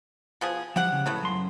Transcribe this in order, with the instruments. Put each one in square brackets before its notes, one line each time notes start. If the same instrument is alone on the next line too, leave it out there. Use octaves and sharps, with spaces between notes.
[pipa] B2 F3 G#4
[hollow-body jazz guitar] F3 [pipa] G4 F#5
[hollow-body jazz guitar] C#3
[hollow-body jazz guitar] A2 [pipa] C#3 A3 B3
[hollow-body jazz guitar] F#2 C6